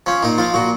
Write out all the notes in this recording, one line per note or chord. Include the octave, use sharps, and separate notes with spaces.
F3 C#4
A#2 D#4
F3 F4
A#2 F#4